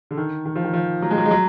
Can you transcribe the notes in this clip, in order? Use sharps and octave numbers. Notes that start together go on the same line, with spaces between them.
D3
D#3
D#3
F3
D#3
F3
F#3
G#3
F#3
G#3
F#3